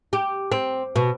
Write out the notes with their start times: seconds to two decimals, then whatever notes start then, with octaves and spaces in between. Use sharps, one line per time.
0.13 G4
0.52 C4
0.96 B2